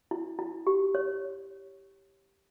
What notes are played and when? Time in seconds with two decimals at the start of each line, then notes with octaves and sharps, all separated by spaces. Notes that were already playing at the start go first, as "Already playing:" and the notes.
0.11 E4
0.39 E4
0.67 G4
0.95 C#5